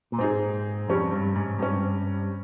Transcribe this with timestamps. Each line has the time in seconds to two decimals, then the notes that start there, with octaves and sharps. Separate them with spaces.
0.12 A#2
0.19 G#2 C4 D#4 G#4
0.89 F2 C3 G3 C#4
1.12 G2
1.36 G#2
1.59 G2 C3 G3 C#4